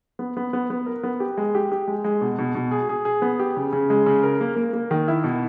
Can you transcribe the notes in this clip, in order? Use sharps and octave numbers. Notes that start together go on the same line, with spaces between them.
B3
B3
B3
B3
A#4
B3
G4
G#3
G4
G4
G#3
G#3
B2
B2
B2
G#4
G#4
G#4
B3
G4
C#3
C#3
G#3
C#3
A#4
A#3
A#3
A#3
D#3
E4
B2